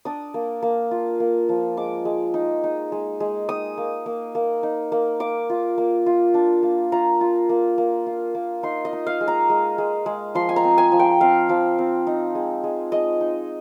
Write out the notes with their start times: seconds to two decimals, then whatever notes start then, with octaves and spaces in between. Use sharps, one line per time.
0.05 D4 D#6
0.34 A#3
0.62 A#3
0.91 F4
1.20 A#3
1.49 F3
1.77 G#3 D6
2.05 G#3
2.34 D#4
2.64 D#4
2.92 G#3
3.20 G#3
3.49 D#4 D#6
3.78 A#3
4.06 A#3
4.35 A#3
4.63 D#4
4.92 A#3
5.20 A#3 D6
5.50 F4
5.78 A#3
6.06 F4
6.34 D4
6.63 A#3
6.92 F4 A#5
7.21 F4
7.49 A#3
7.78 A#3
8.07 F4
8.35 A#3
8.63 D#4 C6
8.85 D#5
8.93 D#4
9.07 F5
9.21 G#3
9.28 A#5
9.49 G#3
9.78 G#3
10.06 G#3
10.35 F3 C6
10.49 G#5
10.56 A#5
10.64 C4
10.78 G#5
10.92 F3
10.99 G5
11.21 C4 F5
11.49 F3
11.79 C4
12.07 D#4
12.35 G#3
12.64 G#3
12.92 G#3 D#5
13.21 D#4